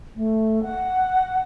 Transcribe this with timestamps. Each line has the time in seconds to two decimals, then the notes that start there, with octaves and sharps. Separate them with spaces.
0.15 A3
0.62 F#5